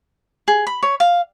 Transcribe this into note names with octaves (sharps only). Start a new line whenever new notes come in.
G#4
B5
C#5
F5